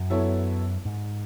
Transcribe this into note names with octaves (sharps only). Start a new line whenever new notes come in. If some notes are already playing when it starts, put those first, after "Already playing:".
Already playing: F#2
F#3 B3 E4 A4 C#5
G#2